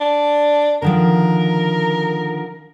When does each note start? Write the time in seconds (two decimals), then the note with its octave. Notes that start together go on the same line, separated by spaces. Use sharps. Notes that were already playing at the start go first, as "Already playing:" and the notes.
0.01 D4
0.82 D3 D#3 F3 A#4